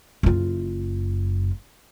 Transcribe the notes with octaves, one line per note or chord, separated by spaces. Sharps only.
F#1 F4